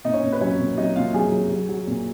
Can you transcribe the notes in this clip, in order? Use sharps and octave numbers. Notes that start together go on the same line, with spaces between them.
A#2 D#4 D#5
C#4 C#5
A#2
B4
F#3 C#4 C#5
A#2
F#3 D#4 D#5
A#2 F4 F5
F#3 G#4 G#5
F#3
F#3
F#3
A#2